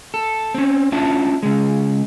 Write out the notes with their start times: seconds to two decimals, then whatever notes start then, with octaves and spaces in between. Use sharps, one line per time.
0.14 A4
0.54 C4 C#4
0.92 C#4 D4 F4 E5 A5
1.43 C#3 G#3